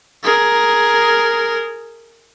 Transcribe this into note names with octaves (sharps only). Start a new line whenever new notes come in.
G#4 A#4